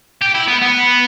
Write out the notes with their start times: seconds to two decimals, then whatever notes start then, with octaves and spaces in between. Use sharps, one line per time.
0.21 G4
0.35 E4
0.48 B3
0.62 B3